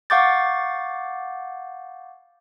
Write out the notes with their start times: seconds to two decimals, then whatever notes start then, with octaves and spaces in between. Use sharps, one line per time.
0.10 F5 F#5 C#6 D6 G6 A6